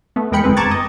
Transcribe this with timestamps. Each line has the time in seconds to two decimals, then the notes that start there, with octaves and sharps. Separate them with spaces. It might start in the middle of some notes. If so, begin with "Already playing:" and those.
0.16 A3 B3
0.32 E2 G#3 A#4 G5 B5 C#7
0.44 G1 F2 G#3 C4 B4
0.57 A5 A#5 C#6 D6 G#6 A6
0.71 D#5